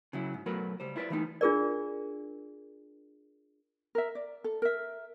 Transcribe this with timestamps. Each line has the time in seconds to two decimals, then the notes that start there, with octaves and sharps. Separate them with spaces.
0.13 C#3 F#3 E4
0.34 G#2
0.46 B2 F#3 A3 F#4 A#4 B4
0.80 C#2 G3 C5
0.96 E4 F4 B4 C5 D5
1.10 E3 G3 A3 C#4 D#4
1.41 D4 F4 G#4 A#4 D5
3.95 A#4 E5
4.15 D5
4.44 A4
4.62 A#4 E5